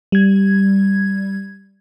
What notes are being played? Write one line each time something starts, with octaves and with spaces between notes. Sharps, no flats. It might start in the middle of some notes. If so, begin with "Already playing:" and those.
G3 G#6